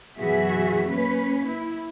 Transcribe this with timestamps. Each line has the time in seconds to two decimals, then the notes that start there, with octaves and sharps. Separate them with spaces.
0.19 F#2 B2 E3 F#4 G#4 E5
0.89 A#3 C#4 B4
1.47 E4